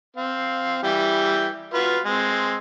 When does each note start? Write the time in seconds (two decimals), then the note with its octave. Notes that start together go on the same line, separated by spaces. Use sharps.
0.17 C4 F5
0.83 E3 G3 G5
1.74 F4 F#4 B4
2.05 G#3 C4